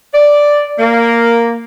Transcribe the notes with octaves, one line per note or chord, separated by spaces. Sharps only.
D5
A#3